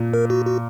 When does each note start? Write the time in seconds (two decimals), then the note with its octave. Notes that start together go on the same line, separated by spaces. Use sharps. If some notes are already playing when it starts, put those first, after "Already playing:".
Already playing: A#2
0.13 A#4
0.30 F#4
0.46 F#4